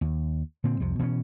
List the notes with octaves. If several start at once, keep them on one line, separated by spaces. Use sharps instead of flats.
D#2
A#2 D3 C4
C2 F2 C3
B2 E3 C4 C#4